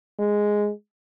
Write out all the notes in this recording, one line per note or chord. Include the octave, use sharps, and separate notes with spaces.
G#3